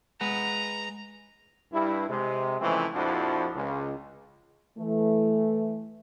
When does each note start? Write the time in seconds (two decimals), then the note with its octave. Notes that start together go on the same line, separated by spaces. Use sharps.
0.21 G#3 B4 F#5 A#5
1.72 G2 E4
2.09 C3 G#3
2.61 C#3 E3 F3 G#3 A3 C4
2.94 A#1 F2 F3 D4 E4 F#4
3.55 C#2
4.78 E3 A3